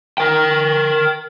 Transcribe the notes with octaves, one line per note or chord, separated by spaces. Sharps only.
A#4 G5